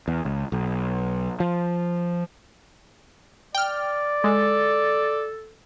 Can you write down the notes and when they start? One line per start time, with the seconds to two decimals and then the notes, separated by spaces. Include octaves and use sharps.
0.08 E2
0.25 C#2
0.52 B1
1.40 F3
3.55 D5 G5 F6
4.24 G#3 A4